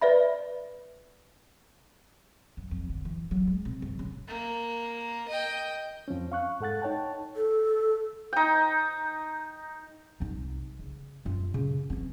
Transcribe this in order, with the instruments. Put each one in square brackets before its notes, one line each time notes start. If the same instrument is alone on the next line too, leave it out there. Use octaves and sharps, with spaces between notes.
[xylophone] B4 D5 E5 B5
[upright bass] F#2
F2
D3
E3
F#3
G#3
C3
F#2
C#3
[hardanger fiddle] A#3
D#5 G5
[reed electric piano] F2 F3 C4 C#4
F5 C#6 F#6
G#2 A4 F#5 F#6 A6
D#4 C#5 G5 A5
[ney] A4
[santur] D#4 G5
[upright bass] C2 D#4
C#3
F#2 F4
C#3
E3 C4